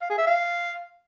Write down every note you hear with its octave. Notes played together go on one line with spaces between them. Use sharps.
F5
G#4
E5
F5